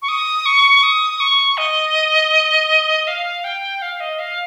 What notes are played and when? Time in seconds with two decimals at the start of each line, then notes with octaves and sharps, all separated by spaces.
0.02 C#6
0.09 D#6
0.46 C#6
0.83 D#6
1.20 C#6
1.58 D#5
3.07 F5
3.44 G5
3.82 F5
4.00 D#5
4.19 F5